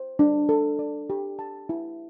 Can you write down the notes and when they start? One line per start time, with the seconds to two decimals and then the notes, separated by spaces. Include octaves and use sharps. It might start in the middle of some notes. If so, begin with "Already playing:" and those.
Already playing: C5
0.19 D4
0.49 A4
0.79 D5
1.10 G4
1.39 A5
1.69 E4